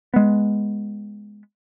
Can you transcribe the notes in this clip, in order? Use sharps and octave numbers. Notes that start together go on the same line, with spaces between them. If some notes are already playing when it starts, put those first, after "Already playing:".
G#3 B3